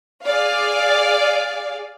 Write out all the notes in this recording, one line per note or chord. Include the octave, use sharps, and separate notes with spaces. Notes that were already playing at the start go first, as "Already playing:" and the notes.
G#4 D5 F5